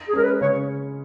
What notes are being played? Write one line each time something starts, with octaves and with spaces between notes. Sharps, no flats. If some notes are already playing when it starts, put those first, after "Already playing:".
G#4
G#3 C#4 A#4
B4
C#3 C#5